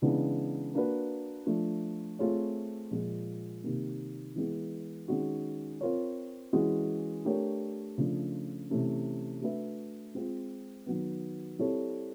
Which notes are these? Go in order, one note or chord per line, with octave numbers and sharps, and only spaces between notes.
C#3 E3 G#3 B3 D4
A#3 D4 F#4 B4
F3 A3 D4
A3 C4 F4 G#4 C#5
A#2 F3 G#3
C3 D#3 G3 A#3
E3 G#3 B3
D#3 G#3 C#4 F#4
C4 F4 A#4 C#5
E3 G#3 C#4 F#4
A3 D4 G4 A#4 C#5
C#3 F3 A3 D4
C3 E3 A3 C#4
A3 D4 F#4 B4 E5
G#3 C4 F4
D#3 F#3 B3
G3 C4 E4 A4 C#5